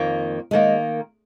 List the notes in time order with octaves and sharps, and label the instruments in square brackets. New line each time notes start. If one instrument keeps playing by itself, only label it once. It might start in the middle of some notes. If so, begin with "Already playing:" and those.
Already playing: [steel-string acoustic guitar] F2 D#3 A#3
[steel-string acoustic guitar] D#3 A#3 [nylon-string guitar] G#3